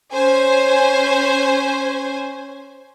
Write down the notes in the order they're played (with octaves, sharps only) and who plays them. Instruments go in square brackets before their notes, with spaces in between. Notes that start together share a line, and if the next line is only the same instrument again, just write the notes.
[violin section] C#4 C5 G#5